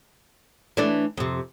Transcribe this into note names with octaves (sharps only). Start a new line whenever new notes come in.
E3 A3 D4
F2 C3